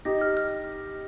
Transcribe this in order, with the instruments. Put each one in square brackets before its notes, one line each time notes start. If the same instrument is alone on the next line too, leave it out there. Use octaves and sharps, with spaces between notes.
[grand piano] D#4 G4 [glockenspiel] A#6
[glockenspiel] F6
F6